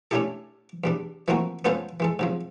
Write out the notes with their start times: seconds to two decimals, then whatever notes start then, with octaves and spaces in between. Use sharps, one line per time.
0.11 A3 C#4 D4 E4 G4 A4
0.84 E2 G3 D4
1.28 E3 F3 A3 A#3 C4 F#4
1.65 B3 C#4 F4 A4 B4 C5
2.00 E3 G#3 A4
2.19 G#2 C3 F3